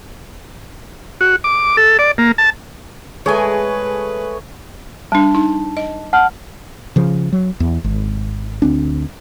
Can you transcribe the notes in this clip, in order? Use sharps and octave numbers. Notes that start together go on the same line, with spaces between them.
F#4
D6
A4
D5
A#3
A5
G#3 A3 G#4 B4 C#5 G#5
G3 D4 A5
D#4
D#5
F#5 A5 F6
C#3 F3
F#3
E2
G#1
D2 C4 D4